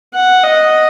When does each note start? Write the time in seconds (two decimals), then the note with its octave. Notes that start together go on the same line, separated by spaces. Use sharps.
0.14 F#5
0.44 D#5